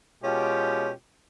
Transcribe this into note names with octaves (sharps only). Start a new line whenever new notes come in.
B2 G#3 C#4 F4 G4